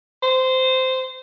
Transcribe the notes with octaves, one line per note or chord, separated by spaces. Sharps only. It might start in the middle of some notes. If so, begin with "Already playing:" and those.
C5